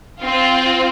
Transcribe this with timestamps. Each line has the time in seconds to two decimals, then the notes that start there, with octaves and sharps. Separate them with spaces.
0.19 C4 F4